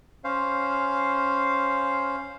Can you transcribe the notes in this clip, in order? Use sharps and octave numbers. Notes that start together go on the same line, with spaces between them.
C#4 C5 F5